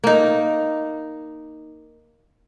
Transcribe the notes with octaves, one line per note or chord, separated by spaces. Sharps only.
A#3 D#4